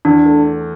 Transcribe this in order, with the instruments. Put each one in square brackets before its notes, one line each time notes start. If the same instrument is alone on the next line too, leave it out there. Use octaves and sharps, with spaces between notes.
[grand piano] E2 [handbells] D4
[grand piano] A3